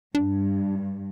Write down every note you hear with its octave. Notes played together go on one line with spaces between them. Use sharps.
G2 D4